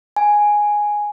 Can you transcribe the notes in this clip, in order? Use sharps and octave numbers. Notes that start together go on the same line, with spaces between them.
G#5